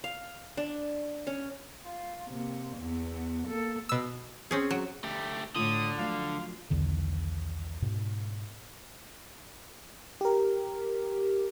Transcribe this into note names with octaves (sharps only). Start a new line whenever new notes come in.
F5
D4
C#4
F4
C3 A#3
E2 B3
A#3 A4
B2 E6
C4 C#4 G#4
F#3
D3 A3 G4
A2 D3 F4 D#6
F3 F#3 A3 F5
B1 E2 D3 D#3
G#2 B2
G4 A#4